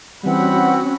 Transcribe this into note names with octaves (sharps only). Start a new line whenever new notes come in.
E3 G3 C4 C#4 F#4 F#5 B5